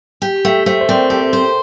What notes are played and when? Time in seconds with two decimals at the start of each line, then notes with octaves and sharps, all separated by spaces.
0.22 G4
0.45 A3 E5 G5
0.66 A3 C5 E5
0.81 C5
0.88 C4 A#4 D5
1.10 G4 A4
1.33 C5